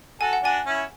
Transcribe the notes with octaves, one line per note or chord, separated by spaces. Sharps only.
F#4 A4 G#5
F#5
D4 F#4 G#5
C#4 E4